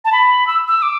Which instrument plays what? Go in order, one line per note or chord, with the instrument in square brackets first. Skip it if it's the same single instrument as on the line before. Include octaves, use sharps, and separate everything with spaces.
[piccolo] A5
B5
E6
E6
D6